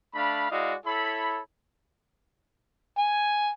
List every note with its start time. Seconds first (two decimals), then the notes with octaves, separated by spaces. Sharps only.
0.15 A3 D4 F5 B5
0.51 G#3 E4 F#4 D5 D#5 F5
0.86 E4 A4 C#5 B5
2.98 G#5